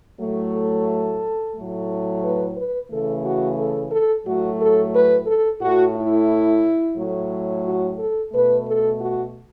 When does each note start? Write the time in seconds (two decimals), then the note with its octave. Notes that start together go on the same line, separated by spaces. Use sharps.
0.19 A2 F#3 A3
0.53 A4
1.56 A2 F#3 A3
2.23 B4
2.56 B4
2.90 C#3 E3 A3 A4
3.25 F#4
3.59 A4
3.92 A4
4.26 A2 F#3 A3 F#4
4.61 A4
4.94 B4
5.27 A4
5.61 A2 A3 F#4
5.96 E4
6.97 A2 F#3 A3
7.65 F#4
7.99 A4
8.33 B2 A3 B4
8.67 A4
9.00 F#4